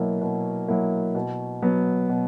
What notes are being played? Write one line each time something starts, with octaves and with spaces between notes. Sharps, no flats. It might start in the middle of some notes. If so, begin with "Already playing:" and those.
Already playing: B2 F#3 A#3 E4
B2
F#3 A#3 E4
B2
F#3 B3
B2